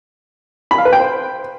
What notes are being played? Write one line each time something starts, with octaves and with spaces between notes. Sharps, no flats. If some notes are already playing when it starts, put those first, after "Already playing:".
B5
F5
B4
G5
C5